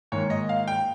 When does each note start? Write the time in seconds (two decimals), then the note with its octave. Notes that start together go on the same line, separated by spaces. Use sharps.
0.12 G#2 D#3 A#3 C#5
0.30 D#5
0.49 F5
0.68 G5